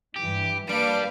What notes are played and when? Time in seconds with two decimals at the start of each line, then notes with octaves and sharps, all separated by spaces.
0.16 G2 E3 G4
0.69 G3 A#3 D4 B4 F5 D7